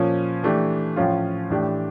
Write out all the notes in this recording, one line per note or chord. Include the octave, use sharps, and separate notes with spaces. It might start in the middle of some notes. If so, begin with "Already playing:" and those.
Already playing: A#2 F3 C#4
E3 A3 D4 G4
A2 F3 C#4 F4
A2 E3 A3 D4 G4